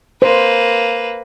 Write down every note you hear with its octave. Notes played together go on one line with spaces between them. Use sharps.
A#3 B4 C5